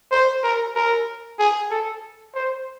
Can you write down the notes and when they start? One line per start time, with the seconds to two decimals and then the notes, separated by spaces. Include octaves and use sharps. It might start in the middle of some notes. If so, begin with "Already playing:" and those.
0.11 C5
0.44 A#4
0.75 A#4
1.39 G#4
1.71 A4
2.35 C5